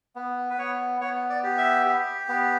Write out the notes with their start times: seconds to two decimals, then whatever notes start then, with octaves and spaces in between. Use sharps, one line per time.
0.16 B3
0.50 B4
0.58 B3 C#5
1.01 B3 C#5
1.30 D5
1.43 G4
1.58 E5
1.86 G4
2.29 B3